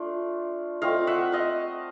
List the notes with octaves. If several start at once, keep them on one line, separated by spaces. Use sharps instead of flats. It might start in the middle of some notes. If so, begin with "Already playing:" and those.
Already playing: A3 D4 F4
A3 C4 F4 D#5 F5
E5 F#5
D#5 F5